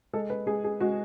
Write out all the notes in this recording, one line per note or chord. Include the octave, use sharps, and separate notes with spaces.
G#3 A4
B4
G#3 G#4
G#4
G#3 F#4